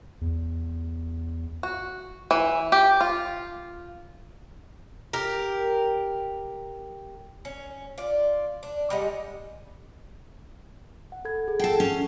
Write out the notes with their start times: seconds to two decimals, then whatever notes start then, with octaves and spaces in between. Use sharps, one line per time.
0.21 E2
1.63 F#4
2.31 E3
2.72 G4
3.01 F4
5.13 G4 A#4
7.45 C#4
7.98 F4 D5
8.63 D4
8.90 G3 G#3 D#5 F#5
11.12 F#5
11.25 A4 B5 G#6
11.48 G#4
11.59 A4 F#5 G5 A5 C7
11.80 C#4